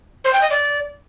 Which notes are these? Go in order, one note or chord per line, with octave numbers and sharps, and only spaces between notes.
C5
G5
D#5
D5